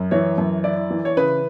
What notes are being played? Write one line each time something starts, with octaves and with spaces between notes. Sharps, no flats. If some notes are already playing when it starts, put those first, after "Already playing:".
Already playing: F#2
E3 C#5
F#2
E4 D5
E3
C#5
C#3 B4